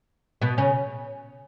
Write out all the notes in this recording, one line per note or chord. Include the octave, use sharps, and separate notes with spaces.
B2 B3
C#3 C#4